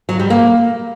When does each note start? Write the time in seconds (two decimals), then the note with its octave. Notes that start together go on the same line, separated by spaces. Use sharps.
0.09 F#3
0.20 G3
0.30 A#3